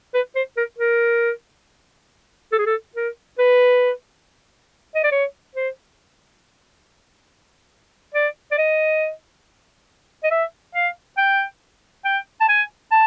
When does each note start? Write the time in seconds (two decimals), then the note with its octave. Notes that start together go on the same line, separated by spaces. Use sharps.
0.14 B4
0.35 C5
0.57 A#4
0.79 A#4
2.52 A4
2.59 G#4
2.66 A4
2.96 A#4
3.39 B4
4.95 D#5
5.04 D5
5.11 C#5
5.56 C5
8.15 D5
8.51 D5
8.58 D#5
10.23 D#5
10.31 E5
10.75 F5
11.17 G5
12.05 G5
12.41 A5
12.49 G#5
12.92 A5